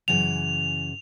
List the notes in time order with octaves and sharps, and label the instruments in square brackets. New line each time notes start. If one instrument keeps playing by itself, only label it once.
[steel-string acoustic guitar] F#2 C#3 E3 [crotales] F7